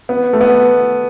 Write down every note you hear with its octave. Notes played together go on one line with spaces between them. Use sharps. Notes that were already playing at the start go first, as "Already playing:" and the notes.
B3
A3
B3